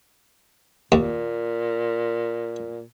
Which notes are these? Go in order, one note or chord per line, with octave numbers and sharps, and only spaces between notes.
D#2 A#2